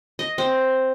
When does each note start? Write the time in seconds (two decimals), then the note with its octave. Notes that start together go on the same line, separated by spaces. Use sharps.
0.19 D#5
0.38 C4